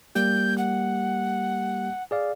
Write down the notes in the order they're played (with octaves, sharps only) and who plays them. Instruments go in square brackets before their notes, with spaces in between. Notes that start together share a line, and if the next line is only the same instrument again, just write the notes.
[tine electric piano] G3 A#3 G4 [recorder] G6
[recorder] F#5
[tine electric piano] G#4 D5 F5